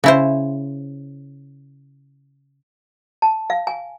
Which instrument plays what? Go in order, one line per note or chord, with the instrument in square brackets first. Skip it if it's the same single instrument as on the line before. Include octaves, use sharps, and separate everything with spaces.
[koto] C#3 E4 C5
[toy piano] A5
F5
G#5